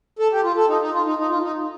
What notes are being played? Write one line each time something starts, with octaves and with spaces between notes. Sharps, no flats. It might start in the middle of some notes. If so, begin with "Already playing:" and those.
A4
G4
F4
A4
D#4
D#4
F4
D#4
D#4
F4
D#4